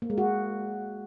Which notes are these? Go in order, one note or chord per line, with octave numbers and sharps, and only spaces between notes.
A#3
G#3
F#4